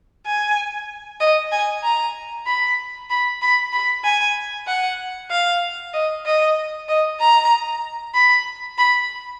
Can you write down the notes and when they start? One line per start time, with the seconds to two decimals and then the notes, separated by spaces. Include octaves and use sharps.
0.26 G#5
1.20 D#5
1.52 G#5
1.84 A#5
2.47 B5
3.10 B5
3.42 B5
3.73 B5
4.04 G#5
4.68 F#5
5.31 F5
5.93 D#5
6.26 D#5
6.89 D#5
7.20 A#5
8.15 B5
8.78 B5